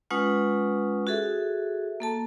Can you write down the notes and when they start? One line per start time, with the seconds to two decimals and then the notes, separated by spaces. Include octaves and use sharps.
0.11 G#3 C#4 F4 B4 F#5 D#6
1.07 F#4 G#4 A4 E5
2.00 A#3 A4 A5